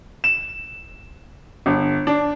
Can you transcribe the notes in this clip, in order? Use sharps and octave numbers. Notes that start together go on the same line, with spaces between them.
E7
G1
D4